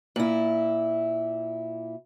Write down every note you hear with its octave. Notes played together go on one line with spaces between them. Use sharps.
A#2 E4